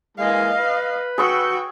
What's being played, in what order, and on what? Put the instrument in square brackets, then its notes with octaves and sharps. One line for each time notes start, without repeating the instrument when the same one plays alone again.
[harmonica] E3 G#3 A#3 [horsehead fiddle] D#5 F5
[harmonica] B4
[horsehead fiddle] F#4 G5 [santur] G#4 C#6 E6